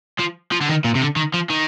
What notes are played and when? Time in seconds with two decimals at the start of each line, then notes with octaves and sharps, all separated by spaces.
0.20 F3
0.52 F3
0.61 D3
0.69 D#3
0.84 A#2
0.95 C3
1.01 D3
1.16 D#3
1.34 F3
1.50 D#3